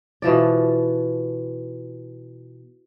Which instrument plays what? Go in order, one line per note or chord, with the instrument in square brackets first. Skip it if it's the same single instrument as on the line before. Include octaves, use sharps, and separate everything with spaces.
[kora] B2 E3 F3 D5